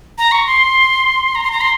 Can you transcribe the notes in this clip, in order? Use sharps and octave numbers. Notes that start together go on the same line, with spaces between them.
A#5
C#6
C6
A#5
C6
A#5
C6